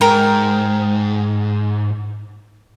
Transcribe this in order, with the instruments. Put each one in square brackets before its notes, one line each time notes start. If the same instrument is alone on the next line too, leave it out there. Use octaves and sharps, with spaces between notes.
[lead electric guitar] G#2 [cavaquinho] A#4 G5